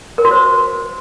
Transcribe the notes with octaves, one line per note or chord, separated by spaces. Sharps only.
A#4
F#4
C5